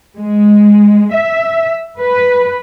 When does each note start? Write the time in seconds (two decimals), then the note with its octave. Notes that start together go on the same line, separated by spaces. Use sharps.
0.17 G#3
1.14 E5
1.99 B4